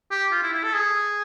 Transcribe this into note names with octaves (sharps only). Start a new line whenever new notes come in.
G4
F4
E4
E4
A4
G#4